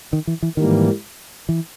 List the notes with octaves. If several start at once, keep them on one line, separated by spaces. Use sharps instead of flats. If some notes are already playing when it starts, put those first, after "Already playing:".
D#3
E3
E3
G#2 D#3 E3 G3 A#3
E3